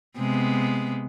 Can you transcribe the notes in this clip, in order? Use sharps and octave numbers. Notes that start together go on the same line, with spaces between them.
C3 G#3 B3